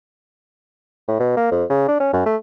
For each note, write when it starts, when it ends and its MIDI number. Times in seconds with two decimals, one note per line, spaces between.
1.08 1.19 45
1.20 1.36 47
1.36 1.47 58
1.51 1.64 41
1.70 1.86 49
1.88 1.98 62
2.00 2.09 61
2.13 2.22 42
2.26 2.36 57